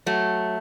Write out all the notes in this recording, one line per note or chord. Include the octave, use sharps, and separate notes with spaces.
F#3 A3